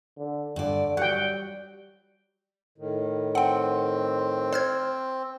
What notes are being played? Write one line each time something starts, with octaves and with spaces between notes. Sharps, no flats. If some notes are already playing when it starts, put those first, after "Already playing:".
D3
G2 D3 D5
F#3 G3 F#5 G5
A2 D#3
C4 F#5 G5
C5 F6 G#6